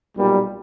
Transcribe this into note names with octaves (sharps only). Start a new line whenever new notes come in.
B1 A#2 G3